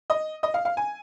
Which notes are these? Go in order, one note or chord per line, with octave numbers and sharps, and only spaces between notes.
D#5
D#5
F5
F5
G#5